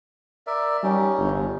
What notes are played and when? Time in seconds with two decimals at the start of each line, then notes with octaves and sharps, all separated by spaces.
0.47 A#4 D5 E5
0.83 G3 C#4 D#4
1.18 G1